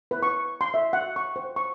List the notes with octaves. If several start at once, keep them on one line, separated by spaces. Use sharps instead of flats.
B4
C#6
C6
E5
F#5
C#6
C5
C#6